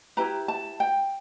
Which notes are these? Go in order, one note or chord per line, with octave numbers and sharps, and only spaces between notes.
E4 G4 B4 A#5
A5
G5